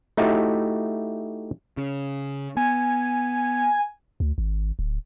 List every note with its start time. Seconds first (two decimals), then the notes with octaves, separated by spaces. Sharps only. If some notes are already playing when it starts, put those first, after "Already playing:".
0.17 A3 D#4 E4 F#4 G4
1.77 C#3
2.57 B3 G#5
4.20 D2
4.38 G#1
4.79 D1